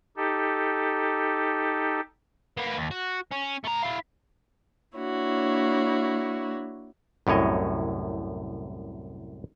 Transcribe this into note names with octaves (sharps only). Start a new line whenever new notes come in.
D#4 G4 A4
A#3 B3
D#2
F#4
C#4
A3 A#5
E4 F5
A#3 D4 E4 F#4 C#5
C2 F#2 A2 C#5 D#5